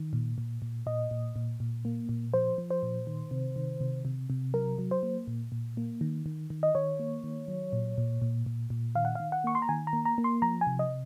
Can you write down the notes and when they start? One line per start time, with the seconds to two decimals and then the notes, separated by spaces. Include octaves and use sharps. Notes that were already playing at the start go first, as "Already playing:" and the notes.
Already playing: D#3
0.13 A#2
0.38 A#2
0.62 A#2
0.86 A#2 D#5
1.11 A#2
1.36 A#2
1.60 A#2
1.85 A#3
2.09 A#2
2.34 F3 C5
2.58 F3
2.70 C5
2.83 A#2
3.07 D#3
3.31 C3
3.56 D#3
3.81 C3
4.05 C3
4.30 C3
4.54 F#3 A#4
4.78 F#3
4.91 C5
5.03 A#3
5.27 A#2
5.52 A#2
5.77 A#3
6.01 D#3
6.26 D#3
6.50 D#3
6.63 D#5
6.75 D#3 C#5
6.99 A#3
7.24 D#3
7.48 F#3
7.73 A#2
7.98 A#2
8.22 A#2
8.46 A#2
8.70 A#2
8.95 D#3 F5
9.05 F#5
9.15 D#3 F5
9.32 F#5
9.44 A#3 C#6
9.55 C6
9.62 A#5
9.69 D#3 G#5
9.87 A#5
9.93 A#3
10.05 A#5
10.18 A#3
10.24 C6
10.42 F3 A#5
10.61 G#5
10.67 C3
10.79 D#5